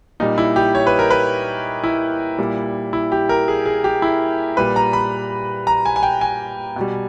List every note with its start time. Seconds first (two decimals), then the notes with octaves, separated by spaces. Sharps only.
0.20 A#2 G3 D#4
0.38 E4
0.56 G4
0.75 C#5
0.87 B4
0.99 A#4
1.10 B4
1.84 E4
2.38 A#2 G3
2.93 E4
3.12 G4
3.29 A#4
3.48 G#4
3.66 G#4
3.84 G4
4.02 E4
4.57 A#2 G3 B4
4.76 A#5
4.93 B5
5.67 A#5
5.85 G#5
5.96 G#5
6.03 G5
6.21 G#5
6.76 B2 G3